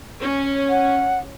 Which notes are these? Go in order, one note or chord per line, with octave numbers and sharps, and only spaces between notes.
C#4
F#5